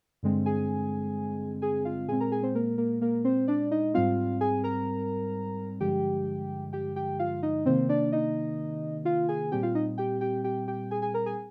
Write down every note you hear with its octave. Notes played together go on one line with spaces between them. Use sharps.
G2 D3 G#3 C4
G#4 G#5
G#4 G#5
F4 F5
A#2 G#3 C4 G#4 G#5
A#4 A#5
G#4 G#5
C4 C5
A#3 A#4
A#3 A#4
A#3 A#4
C4 C5
D4 D5
D#4 D#5
G#2 G3 C4 F4 F5
G#4 G#5
A#4 A#5
G2 D3 F3 G#3 G4 G5
G4 G5
G4 G5
F4 F5
D#4 D#5
C3 D#3 A#3 C4 C5
D4 D5
D#4 D#5
F4 F5
G#4 G#5
A#2 G3 C4 G4 G5
F4 F5
D#4 D#5
G4 G5
G4 G5
G4 G5
G4 G5
G#4 G#5
G#4 G#5
A#4 A#5
G#4 G#5